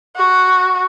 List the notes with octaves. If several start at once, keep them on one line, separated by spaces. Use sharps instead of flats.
F#4